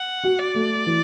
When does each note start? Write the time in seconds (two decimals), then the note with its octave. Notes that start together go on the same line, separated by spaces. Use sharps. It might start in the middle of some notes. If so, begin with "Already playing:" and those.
Already playing: F#5
0.24 F#4
0.39 D5
0.55 A3
0.86 E3